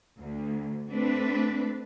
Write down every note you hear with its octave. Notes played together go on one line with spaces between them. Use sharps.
D2
A3 C4 D4 B4